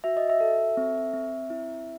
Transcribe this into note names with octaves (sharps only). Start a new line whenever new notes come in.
F#4 E5
D#5
E5
A4
C4
C4
E4